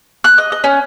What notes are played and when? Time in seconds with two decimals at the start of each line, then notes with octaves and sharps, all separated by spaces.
0.24 F#6
0.38 D#5
0.52 D#5
0.64 C#4